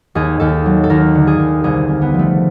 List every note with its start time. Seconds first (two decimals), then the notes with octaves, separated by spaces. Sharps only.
0.15 D#2 G#4
0.40 D#2 A4
0.66 F#3
0.84 A4
0.90 D#2 A#4
1.15 D3
1.27 G#4
1.39 D#2
1.64 C2 G#4
1.88 C2
2.01 B3
2.14 F3
2.19 A3